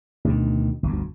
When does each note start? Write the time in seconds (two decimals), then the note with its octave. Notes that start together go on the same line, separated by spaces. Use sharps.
0.25 D2 B2 D#3
0.83 G1 D2